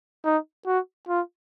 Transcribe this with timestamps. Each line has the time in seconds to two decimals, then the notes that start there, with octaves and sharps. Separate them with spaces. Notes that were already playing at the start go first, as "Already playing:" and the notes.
0.25 D#4
0.66 F#4
1.08 F4